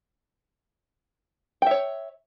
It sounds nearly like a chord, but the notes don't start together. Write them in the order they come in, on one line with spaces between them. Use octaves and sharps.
G5 E5 C#5